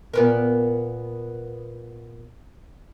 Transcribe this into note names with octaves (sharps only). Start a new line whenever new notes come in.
A#2 B3 A#4